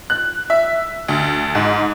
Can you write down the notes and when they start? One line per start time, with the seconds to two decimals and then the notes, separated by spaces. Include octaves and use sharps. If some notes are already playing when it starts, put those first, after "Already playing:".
0.10 F#6
0.50 E5
1.08 D2
1.55 G#2